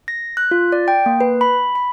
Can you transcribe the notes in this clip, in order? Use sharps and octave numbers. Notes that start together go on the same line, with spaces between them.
A#6
F#6
F4
D5
G5
A#3
B4
B5
B5